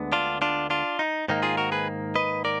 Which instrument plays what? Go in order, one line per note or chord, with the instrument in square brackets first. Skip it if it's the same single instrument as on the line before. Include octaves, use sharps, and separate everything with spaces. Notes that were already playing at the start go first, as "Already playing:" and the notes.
Already playing: [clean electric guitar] D2 D3 G#3 B3
D4 F4
D4 F4
D4 F4
D#4
G#2 D#3 A#3 D#4
F4 G#4
F#4 A#4
G#4 B4
B4 D#5
A#4 D5